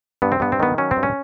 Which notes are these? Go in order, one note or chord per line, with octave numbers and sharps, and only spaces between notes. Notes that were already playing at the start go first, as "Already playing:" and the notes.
G2 B3
C4
G2 B3
C4
D#3 B3
F#3 C#4
C4
G2
C#4